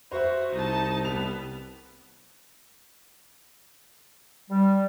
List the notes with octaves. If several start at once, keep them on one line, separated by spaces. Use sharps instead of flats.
F#4 C5 E5
C2 D#4 A5
G3 B3 F7
G3